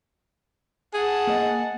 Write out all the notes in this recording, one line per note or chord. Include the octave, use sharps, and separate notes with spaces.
G#4 F#5 A5
A#3 D#5